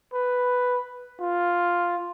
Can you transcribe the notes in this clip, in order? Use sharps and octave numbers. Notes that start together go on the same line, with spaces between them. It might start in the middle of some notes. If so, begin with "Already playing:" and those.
B4
F4